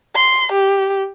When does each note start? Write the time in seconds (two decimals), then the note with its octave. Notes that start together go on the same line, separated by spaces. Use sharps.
0.15 C6
0.52 G4